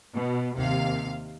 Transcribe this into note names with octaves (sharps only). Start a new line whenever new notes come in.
B2
D#2 C3 F5